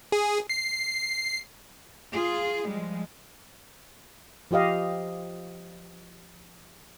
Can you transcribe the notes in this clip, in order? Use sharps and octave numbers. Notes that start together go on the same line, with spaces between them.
G#4
C7
F4 G#4
F3 G3 G#3
F3 F4 G4 D#5 F5